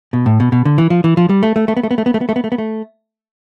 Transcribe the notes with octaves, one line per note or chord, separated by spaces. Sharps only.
B2
A2
B2
B2
D3
E3
F3
E3
F3
G3
A3
A3
A3
B3
A3
B3
A3
B3
A3
B3
A3
B3
A3
B3
A3